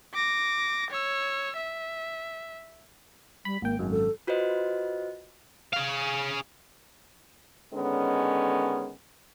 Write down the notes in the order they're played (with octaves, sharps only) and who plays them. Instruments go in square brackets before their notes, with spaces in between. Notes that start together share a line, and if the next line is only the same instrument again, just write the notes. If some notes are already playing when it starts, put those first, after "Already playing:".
[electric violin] D6 A#6
C#5 E6
E5
[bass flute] G3 [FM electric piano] B5
[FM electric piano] G#1 G5 [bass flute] A#3
[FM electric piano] G#1 F#2 [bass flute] G#3
[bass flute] A4
[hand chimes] F4 F#4 B4 C5 D#5
[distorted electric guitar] G#4 F5
[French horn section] D3 D#3 G#3 B3 C#4